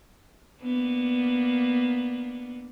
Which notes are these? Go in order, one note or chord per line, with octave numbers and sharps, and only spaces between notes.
A#3 B3 D4